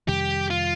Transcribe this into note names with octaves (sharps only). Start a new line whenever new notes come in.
F2 C3 D#3 G3 G4
F4